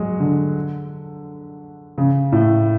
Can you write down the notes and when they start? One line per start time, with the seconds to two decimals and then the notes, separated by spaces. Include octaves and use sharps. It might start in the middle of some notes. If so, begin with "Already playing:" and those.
Already playing: F#3 G#3
0.20 D3
1.98 C#3
2.32 A2